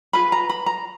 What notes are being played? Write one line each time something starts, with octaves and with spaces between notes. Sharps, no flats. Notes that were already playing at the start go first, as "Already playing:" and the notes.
F4 G#4 B4 B5
A#5
B5
A#5